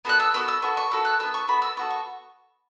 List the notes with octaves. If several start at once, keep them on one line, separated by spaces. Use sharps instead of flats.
B3 F#4 A4 F#6
E6
B3 F#4 A4 E6
E6
B3 F#4 A4 C#6
C#6
B3 F#4 A4 E6
F#6
B3 F#4 A4 E6
C#6
B3 F#4 A4 B5
E6
B3 F#4 A4 C#6
C#6